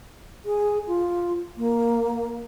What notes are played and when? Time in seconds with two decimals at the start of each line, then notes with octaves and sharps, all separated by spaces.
0.45 G#4
0.87 F4
1.57 A#3